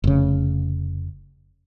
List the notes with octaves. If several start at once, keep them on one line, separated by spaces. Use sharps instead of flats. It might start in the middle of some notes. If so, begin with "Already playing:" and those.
F1 C#3